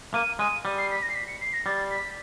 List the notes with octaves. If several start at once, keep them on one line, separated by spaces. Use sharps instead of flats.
A#3 D#7
G#3 D#7
G3
C7
B6
A#6
C7
B6
C#7
C7
A#6
G3 A6
B6